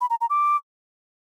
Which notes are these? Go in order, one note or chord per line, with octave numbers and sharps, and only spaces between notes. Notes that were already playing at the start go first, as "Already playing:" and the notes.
B5
A#5
A#5
D6